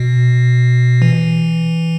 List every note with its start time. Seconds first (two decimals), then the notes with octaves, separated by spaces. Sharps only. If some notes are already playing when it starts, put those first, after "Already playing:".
Already playing: B2
1.02 E3